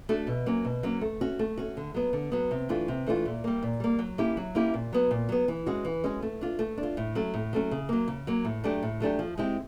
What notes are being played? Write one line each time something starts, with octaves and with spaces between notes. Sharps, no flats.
A3 D4 F#4 A4
B2
F#3 A#3 C#4
B2
F#3 A#3 C#4
A3
C#4 F#4
A3
C#4 F#4
D3
F#3 B3
D3
F#3 B3
C3
E3 A3 D4 F4
C3
E3 A3 D4 F4
A#2
G3 A#3
A#2
G3 A#3
F#3
A#3 C#4 E4 G4
F#3
A#3 C#4 E4 G4
A#2
F#3 B3
A#2
F#3 B3
E3
G#3 C#4 F#4
E3
G#3 C#4 F#4
A3
D4 F4
A3
D4
F4
A2
F#3 A3 C#4
A2
F#3 A3 C#4
C#3
F#3 A#3
C#3
F#3 A#3
A2
F#3 A3 D4 G4
A2
F#3 A3 D4 G4
F3
G#3 C4 E4 G4